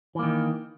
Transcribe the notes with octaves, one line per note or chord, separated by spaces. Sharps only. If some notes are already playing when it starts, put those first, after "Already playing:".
D#3 E3 A#3